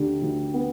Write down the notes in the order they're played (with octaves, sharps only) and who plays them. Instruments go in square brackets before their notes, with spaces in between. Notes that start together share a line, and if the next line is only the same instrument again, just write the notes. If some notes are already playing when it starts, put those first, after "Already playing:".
Already playing: [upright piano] D2 D3 G4
D2
B3